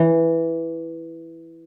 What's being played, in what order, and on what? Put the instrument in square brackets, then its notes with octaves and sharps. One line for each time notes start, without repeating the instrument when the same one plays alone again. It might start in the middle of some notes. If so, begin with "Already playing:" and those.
Already playing: [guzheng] E3